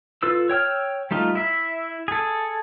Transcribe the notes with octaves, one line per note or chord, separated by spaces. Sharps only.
F4 A4 B4 E6
C#5 G5 E6 F6
G3 A3 D#4 F4
E4 E5
G#4 A4